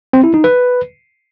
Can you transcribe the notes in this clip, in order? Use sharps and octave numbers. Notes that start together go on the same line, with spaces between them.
C4
E4
D#4
B4